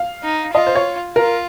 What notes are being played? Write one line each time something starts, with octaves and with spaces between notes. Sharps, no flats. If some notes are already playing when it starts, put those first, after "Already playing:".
Already playing: F5
D#4
F4 D#5
C5
C#5
F4 A#4